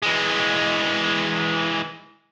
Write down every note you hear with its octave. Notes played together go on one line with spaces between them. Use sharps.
E3 G#3